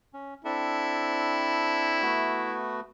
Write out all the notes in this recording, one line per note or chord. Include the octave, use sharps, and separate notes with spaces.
C#4
C4 D4 E4 A4
A3 B3 F#4